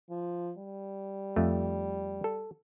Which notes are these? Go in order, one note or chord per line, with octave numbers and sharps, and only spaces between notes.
F3
G3
F2 A3
A4